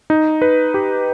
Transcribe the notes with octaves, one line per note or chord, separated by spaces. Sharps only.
D#4
B4
G4